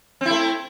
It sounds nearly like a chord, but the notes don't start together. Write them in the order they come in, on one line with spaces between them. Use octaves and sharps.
C4 E4 A3